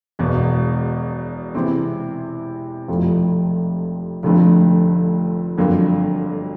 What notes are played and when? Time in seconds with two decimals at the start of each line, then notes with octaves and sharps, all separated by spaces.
0.19 E1 E2 B2
1.54 C3 E3 G#3 C4 E4
2.88 F1 F2 C3 F3
4.23 F1 F2 D3 F3 A3
5.58 G1 F2 D3 F#3 A#3